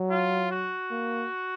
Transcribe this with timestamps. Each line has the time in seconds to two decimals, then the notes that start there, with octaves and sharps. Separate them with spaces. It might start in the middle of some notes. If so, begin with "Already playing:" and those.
Already playing: F#3
0.10 F4
0.51 F#4
0.90 A#3